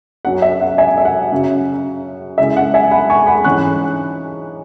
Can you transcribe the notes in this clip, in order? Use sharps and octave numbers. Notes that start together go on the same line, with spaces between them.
F#2 F#3 C#4 F#5
E5
F#5
E5 G#5
E5
F#5
F#2 C#3 F#3
C#3 G#3 E4 E5
F#5
E5 G#5
F#5 B5
G#5 C#6
F#5 B5
G#2 E3 C#4 C#6 F#6